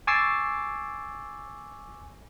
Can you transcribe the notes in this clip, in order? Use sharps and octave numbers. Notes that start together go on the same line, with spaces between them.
G#5 C#6 D6 E6 A6 C7